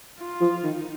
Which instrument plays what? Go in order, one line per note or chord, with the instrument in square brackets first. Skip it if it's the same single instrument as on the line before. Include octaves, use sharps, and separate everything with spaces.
[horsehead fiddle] F4
[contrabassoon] F3
[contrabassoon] D#3 [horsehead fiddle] D#4